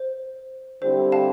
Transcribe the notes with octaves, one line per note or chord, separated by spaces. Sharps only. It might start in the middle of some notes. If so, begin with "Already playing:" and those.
Already playing: C5
D3 G3 C4 E4 G4 C5
F5 A5